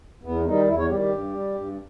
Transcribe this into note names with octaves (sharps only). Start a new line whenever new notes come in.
E2 B3
D#3 G3 D#4
E2 E4
C#5
D#3 G3 G4
G4
G2
G3
G2